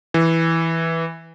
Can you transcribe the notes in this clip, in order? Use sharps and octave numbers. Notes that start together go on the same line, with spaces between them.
E3